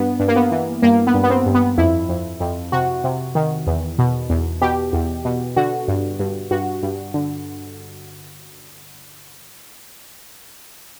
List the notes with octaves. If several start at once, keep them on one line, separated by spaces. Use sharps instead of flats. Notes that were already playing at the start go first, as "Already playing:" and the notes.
Already playing: G2 B3
G2
A#3
B3
E3
G2 A#3
B3
G2
B3
C4
G2
B3
F2 E4
F2
F2
C3 F#4
C3
D#3
E2
B2
E2
B2 G4
E2
B2
D3 F#4
G2
G2
G2 F#4
G2
D3